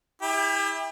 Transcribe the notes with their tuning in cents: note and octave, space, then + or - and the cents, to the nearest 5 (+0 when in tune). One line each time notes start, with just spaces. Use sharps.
E4 -20 G4 +35